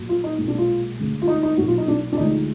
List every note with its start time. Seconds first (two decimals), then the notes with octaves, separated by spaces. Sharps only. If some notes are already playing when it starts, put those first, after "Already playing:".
Already playing: A#1 A#2 F#3
0.09 F4
0.24 D#4
0.38 B1 A#2 G#3
0.48 D4
0.58 F4
0.98 D2 D3 G#3
1.22 F4
1.27 D#4
1.43 D#4
1.57 B1 A#2 F#3 F#4
1.68 F4
1.78 D#4
1.88 D4
2.12 D4
2.17 D2 D3 F3 G#3 D#4